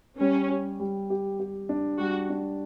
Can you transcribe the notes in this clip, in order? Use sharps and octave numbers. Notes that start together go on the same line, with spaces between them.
G3 C#4
G4
G3
G4
G4
D4
G3 F#4
D4